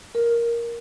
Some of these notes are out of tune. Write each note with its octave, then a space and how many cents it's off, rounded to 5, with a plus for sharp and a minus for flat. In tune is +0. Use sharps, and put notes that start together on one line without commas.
A#4 +5